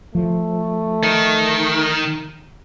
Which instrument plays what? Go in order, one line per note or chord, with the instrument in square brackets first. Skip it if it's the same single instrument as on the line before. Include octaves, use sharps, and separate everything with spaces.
[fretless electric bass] F3 [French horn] A3
[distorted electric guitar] D#3